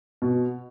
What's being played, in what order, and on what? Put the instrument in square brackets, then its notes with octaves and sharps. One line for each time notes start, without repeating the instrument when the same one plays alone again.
[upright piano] B2